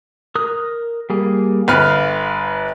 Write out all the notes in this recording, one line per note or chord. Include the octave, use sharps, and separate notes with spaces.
A#4 D#6 F#6
G3 A#3 G#4
G1 B4 F5 F6